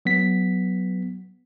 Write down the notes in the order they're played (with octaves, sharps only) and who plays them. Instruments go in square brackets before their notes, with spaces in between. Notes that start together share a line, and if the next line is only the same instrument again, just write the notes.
[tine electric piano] F#3 B3 B6